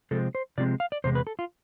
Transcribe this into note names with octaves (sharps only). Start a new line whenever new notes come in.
C3 F3 G#3 C4 A4
C5
C3 F3 G#3 C4 D5
F5
D5
E2 C3 G#3 C5
B4
A4
F4